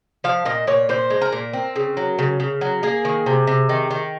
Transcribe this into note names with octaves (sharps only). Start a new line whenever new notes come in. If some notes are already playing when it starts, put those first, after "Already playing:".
F3 F5
A#2 D#5
A#2 C#5
A#2 C5
G#3
A#4
A#2
C4
C#3
F#3
C#3
C#3
F#3
A#3 G#4
D#3
C3
C3
D#3
D#3